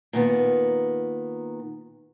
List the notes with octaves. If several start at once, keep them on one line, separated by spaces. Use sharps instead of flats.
A#2 D#3 B3